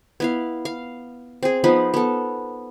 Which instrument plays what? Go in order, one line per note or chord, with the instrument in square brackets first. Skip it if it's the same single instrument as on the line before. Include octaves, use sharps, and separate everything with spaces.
[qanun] B3 E4 F5
F5
C4 G#4
F3 B3 D#4 B4
B3 A4